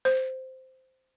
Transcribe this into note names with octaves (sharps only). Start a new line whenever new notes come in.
C5